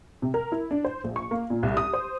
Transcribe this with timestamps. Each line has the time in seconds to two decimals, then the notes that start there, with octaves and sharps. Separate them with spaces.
0.22 C3
0.34 A#4
0.52 E4
0.71 D4
0.85 C5
1.04 A#1
1.16 C#6
1.31 A#3
1.50 A#2
1.63 C2
1.77 D#6
1.93 C5